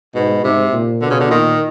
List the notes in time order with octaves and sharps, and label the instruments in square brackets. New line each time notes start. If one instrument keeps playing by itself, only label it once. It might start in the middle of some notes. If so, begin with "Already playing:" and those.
[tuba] G#2 [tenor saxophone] B2
[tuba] G#2 [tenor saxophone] C3
[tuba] A#2
[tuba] B2 [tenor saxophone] D3
[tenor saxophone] C#3
D3
[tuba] A#2 [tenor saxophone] D#3